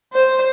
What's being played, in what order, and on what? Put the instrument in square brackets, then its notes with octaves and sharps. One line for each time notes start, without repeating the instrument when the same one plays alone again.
[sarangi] C5